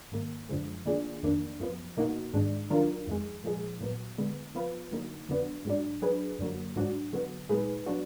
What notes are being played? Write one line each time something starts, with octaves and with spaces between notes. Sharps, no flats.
G#2 D#3 A#3
F#2 D3 F3 G#3
D#3 A#3 D4 F4 G#4
F2 D#3 A#3 D4
F#2 F3 B3
B2 A#3 D#4 F#4
G#2 D#3 G#3 D4
D#3 F#3 D4 F4 A#4
F2 D#3 G#3
A#2 F3 G#3 D#4 G#4
A#2 F#3 B3
D3 G#3 B3
F3 B3 F4 B4
D3 F#3 A#3 D#4
F2 D3 F#3 B3 D4
G#2 F#3 D4
F#3 D4 G#4 B4
F#2 D3 F#3 A#3
G#2 F#3 D4 F#4
D3 F#3 B3
A#2 G#3 D#4 G#4 B4
F#3 B3 D4 F#4